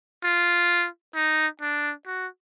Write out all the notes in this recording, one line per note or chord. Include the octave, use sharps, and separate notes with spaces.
F4
D#4
D4
F#4